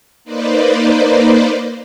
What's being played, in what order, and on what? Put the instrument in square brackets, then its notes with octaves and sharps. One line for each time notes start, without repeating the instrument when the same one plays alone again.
[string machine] A#3 D#4 B4 C5 D5